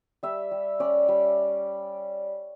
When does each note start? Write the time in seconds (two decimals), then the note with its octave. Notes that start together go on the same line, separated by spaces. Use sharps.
0.23 G3 E5
0.51 G3
0.79 C#4 D5
1.08 G3